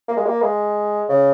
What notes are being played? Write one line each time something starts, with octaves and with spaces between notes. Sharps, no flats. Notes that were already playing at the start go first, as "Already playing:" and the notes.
A#3
G#3
A#3
G#3
C#3